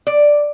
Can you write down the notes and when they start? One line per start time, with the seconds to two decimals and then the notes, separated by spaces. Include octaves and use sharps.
0.07 D5